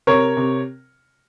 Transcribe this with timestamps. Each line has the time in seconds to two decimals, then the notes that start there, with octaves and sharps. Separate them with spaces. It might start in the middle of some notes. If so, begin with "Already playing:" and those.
0.07 C3 A#4 C#5
0.37 C3